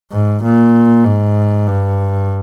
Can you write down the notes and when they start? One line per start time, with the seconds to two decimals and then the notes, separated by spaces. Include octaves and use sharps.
0.12 G#2
0.42 A#2
1.04 G#2
1.67 G2